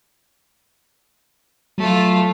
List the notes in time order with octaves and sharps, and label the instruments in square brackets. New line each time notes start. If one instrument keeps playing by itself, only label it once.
[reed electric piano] F#3 [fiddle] A3 F4